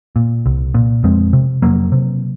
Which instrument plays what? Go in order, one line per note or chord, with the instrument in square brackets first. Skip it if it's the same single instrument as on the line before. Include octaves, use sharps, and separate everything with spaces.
[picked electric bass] A#2
C2
A#2
F2 G#3 C4
C3
F2 F#3 A#3
C3